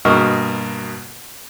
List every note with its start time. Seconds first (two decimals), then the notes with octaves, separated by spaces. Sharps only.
0.05 G2 B2 A#3 A#4 D#5 C#6